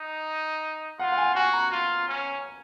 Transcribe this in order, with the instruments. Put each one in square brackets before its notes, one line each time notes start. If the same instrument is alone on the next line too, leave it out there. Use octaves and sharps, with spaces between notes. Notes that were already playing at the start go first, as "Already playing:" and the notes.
Already playing: [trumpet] D#4
[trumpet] F4 [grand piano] F#5
[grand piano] F#5
G#5
[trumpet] F#4 [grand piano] G#5
[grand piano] A#5
[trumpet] F4
C#4